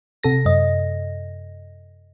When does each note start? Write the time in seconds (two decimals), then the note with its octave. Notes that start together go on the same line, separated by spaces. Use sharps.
0.23 C3 A4 A#6
0.45 F#2 D#5